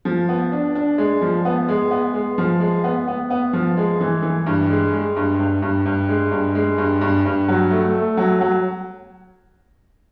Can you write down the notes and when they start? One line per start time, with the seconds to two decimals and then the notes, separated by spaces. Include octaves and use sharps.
0.05 F3
0.29 B3
0.52 D4
0.75 D4
0.98 G#3
1.21 F3
1.45 B3
1.68 G#3
1.91 B3
2.14 G#3
2.38 F3
2.60 G#3
2.84 B3
3.08 B3
3.30 B3
3.53 F3
3.77 G#3
4.00 E3
4.22 E3
4.46 G2
4.70 G#3
4.93 G#3
5.16 G2
5.39 G2
5.62 G2
5.86 G2
6.09 G#3
6.31 G2
6.55 G#3
6.78 G2
7.01 G2
7.25 G2
7.48 F#3
7.71 A3
7.95 A3
8.17 F#3
8.41 F#3